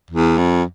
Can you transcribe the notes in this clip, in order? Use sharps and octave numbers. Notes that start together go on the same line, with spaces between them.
E2
F2